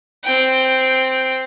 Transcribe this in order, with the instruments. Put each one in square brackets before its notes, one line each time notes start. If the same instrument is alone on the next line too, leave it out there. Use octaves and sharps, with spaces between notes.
[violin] C4 G5